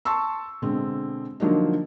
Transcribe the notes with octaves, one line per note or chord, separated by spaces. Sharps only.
A5 C6 C#6 E6
B2 D3 G#3 C4
D3 F3 F#3 A#3 D4 D#4